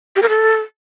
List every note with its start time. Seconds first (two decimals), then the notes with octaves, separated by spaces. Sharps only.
0.16 G4
0.22 A#4
0.29 A4